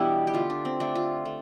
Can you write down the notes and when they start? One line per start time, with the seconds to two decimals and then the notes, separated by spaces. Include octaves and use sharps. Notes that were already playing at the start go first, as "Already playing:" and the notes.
Already playing: B2 E3 G3 B3 D4 E4 G4
0.27 G4
0.33 D3 A3 F4
0.50 D4
0.65 C4
0.80 D3 A3 D4
0.95 F4
1.25 A3